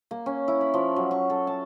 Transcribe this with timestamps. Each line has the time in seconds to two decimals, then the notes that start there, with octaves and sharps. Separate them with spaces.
0.11 A#3
0.26 C#4
0.48 E4
0.61 B5
0.74 F3
0.96 F#3
1.11 C#6
1.30 A4
1.47 A5